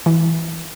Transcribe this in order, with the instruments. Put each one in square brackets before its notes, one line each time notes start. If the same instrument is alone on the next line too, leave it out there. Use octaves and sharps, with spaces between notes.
[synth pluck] E3